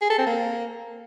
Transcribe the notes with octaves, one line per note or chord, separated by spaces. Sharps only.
G#4
A4
C4
A#3